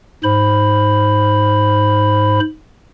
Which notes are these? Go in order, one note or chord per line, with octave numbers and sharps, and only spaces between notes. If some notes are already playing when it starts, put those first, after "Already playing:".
G#2 C5 B5